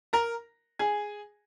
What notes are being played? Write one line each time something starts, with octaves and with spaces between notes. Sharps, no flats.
A#4 A#5
G#4 G#5